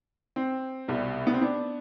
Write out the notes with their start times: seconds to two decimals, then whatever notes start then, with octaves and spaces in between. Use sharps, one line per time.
0.36 C4
0.88 C2 B2 G3
1.27 B3
1.34 C4
1.41 B3 D4